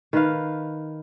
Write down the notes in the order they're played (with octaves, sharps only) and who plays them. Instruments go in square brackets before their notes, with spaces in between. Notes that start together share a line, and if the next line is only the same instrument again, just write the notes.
[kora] D#3 B4 F5